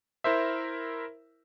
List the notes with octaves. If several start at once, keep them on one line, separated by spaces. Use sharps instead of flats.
E4 A#4 C5 E5